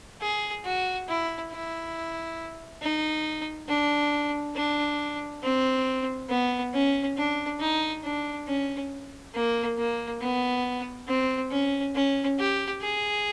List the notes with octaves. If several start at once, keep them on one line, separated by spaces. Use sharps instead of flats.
G#4
F#4
E4
E4
D#4
D4
D4
C4
B3
C#4
D4
D#4
D4
C#4
A#3
A#3
B3
C4
C#4
C#4
G4
G#4